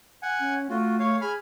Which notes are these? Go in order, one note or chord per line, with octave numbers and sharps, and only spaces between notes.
F#5 G#5
C#4
A3 F4 F#4
C#5 F5
G#4 G#5 B5 F6